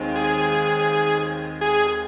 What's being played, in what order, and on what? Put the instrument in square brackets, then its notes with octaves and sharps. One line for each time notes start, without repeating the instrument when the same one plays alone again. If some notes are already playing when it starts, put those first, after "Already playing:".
Already playing: [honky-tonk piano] D#2 D#3 G#3 C4
[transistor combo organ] G#4
G#4